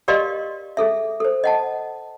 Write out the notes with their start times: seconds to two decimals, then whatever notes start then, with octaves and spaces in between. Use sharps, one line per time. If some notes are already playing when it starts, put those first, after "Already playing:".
0.08 G4 A#4 D5 D#5 F5 C6
0.77 G#4 A4 E5
1.20 A4 C5
1.44 D#5 F#5 A5